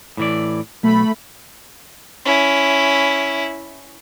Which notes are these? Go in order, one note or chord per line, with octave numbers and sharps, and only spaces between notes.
A2 E3 D5
B1 A3 B5
C#4 E4